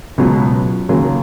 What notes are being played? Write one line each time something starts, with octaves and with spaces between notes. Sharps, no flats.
C#2 B2 F#3 B3
D#2 C#3 F#3